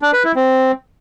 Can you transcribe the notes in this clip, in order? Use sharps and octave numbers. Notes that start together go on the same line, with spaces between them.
D4
B4
E4
C4